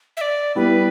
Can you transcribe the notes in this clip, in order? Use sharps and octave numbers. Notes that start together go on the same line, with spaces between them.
E5
D5
G3 B3 E4 B4